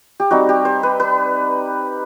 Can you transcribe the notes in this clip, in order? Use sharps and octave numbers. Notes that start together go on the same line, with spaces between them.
G4
G3 C4 D#4 F#4
G4
C5
B4
B4